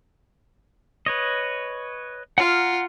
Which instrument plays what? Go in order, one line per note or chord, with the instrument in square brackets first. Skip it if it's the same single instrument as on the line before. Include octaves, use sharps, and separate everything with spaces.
[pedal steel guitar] B4 C#5 D#5
[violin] F4 [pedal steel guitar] F#5 A#5 F6